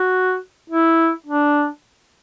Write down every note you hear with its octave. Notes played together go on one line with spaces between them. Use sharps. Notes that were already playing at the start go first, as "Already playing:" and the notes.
Already playing: F#4
E4
D4